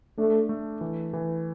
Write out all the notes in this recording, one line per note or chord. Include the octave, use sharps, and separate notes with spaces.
A3 D4
A3
E3
E3